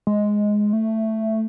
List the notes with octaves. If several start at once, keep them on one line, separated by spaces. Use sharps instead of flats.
G#3
A3